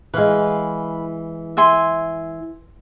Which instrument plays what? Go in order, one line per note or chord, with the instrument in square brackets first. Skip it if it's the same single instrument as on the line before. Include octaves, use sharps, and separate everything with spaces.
[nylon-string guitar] E3 G#3 [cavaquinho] B4 F5
[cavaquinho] E5 G#5 C6